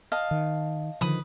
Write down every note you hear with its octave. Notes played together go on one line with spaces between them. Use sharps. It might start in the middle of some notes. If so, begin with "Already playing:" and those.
D#5 F5 A5
D#3
D3 D#3 F3 B4 B5 D#6